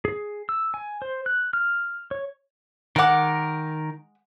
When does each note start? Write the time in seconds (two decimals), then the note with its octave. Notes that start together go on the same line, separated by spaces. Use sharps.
0.05 G#4
0.49 E6
0.74 G#5
1.02 C5
1.26 F#6
1.53 F6
2.11 C#5
2.96 D#3 G#3 A#4 F#5 D6